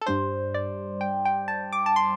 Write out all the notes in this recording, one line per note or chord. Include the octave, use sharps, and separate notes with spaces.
A4
G2 G3 D4 C5
D5
G5
G5
A5
D6
A5
C6